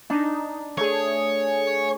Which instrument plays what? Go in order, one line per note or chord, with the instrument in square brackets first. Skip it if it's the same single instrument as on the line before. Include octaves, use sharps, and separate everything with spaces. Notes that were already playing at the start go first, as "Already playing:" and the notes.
[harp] D4 [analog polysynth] D#4
[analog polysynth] A3 G#4 [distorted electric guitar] C#5